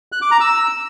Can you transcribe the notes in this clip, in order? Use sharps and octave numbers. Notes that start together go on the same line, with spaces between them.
F#6
D6
A#5
E6